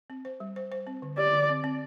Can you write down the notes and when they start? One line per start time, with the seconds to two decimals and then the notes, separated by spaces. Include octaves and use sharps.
0.10 C4
0.25 C5
0.40 G3
0.56 C5
0.72 C5
0.87 C4
1.02 D3
1.18 G4 D5
1.33 D3
1.49 C4
1.64 C4